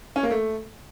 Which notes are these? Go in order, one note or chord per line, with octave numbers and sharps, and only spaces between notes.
C#4
A#3
A3